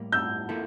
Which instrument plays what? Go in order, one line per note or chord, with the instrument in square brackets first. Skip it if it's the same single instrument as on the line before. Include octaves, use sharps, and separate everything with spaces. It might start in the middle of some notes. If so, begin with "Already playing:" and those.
Already playing: [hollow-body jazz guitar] A2 G3 A#3
[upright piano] E6 G6
[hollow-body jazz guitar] F3 A#3 E4 A4